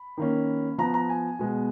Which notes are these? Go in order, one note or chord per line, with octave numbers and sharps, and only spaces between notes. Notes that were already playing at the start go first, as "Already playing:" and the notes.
Already playing: B5
D#3 A#3 C#4
F3 B3 A#5
A#5
G#5
B2 G#3 B3